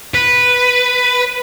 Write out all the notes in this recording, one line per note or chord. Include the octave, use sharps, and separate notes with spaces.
B4